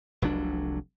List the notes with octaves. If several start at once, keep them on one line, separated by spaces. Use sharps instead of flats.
F1 C2 F#3 D4